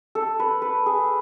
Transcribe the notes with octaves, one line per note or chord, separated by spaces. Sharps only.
A4
B4
B4
G#4